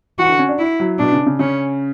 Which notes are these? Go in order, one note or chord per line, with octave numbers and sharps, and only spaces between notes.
E3 F#4
D3
C#4
D4
E4
F#3
B2 D4
C#3
C#3
C#3 C#4